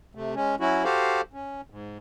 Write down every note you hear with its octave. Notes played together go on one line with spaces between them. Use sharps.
C3 A3
G#3 C#4
F#3 C#4 E4 F#4
F#4 G4 A4 C5 F5
C#4
G#2